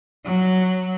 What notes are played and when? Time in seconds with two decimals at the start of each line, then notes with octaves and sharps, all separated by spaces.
0.25 F#3